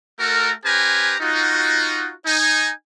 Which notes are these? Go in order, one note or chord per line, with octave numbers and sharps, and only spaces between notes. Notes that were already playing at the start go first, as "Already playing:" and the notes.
A3 F#4 A4 A#4
C#4 G4 B4 C5 G#5 A#5
D#4 F4 F#4
D#4 G#5